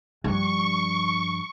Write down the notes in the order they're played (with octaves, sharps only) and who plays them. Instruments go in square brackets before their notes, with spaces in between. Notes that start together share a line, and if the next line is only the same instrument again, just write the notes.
[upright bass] G2 F3 [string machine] C#6